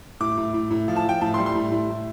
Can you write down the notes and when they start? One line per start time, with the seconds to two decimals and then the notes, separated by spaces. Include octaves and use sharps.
0.20 A2 D6
0.37 A2
0.54 A2
0.71 A2
0.88 F3
0.96 A5
1.05 F3 G5
1.21 A2 A5
1.34 C6
1.38 G3
1.46 C6
1.55 A2
1.72 A2
1.89 A2